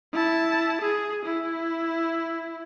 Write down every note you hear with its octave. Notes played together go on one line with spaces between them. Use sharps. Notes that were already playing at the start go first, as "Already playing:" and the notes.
E4 A5
G#4
E4